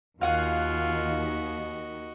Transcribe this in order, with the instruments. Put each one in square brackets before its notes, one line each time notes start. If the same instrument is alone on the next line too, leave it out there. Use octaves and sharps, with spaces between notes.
[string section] D#2 [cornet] F4 [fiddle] F#4 D#5 [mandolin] F5 F#5 G#5